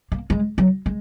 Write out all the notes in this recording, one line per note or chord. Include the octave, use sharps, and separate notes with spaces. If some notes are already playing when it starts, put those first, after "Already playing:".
A#3
G#3
F#3
G#3